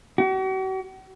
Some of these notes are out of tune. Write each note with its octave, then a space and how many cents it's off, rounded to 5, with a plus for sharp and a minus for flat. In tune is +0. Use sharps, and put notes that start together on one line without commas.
F#4 +45